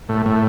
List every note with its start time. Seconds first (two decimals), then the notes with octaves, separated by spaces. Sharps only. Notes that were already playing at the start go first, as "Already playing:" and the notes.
0.09 A2
0.26 A2